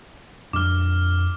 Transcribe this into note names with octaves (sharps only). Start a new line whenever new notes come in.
F2 D4 D6 F6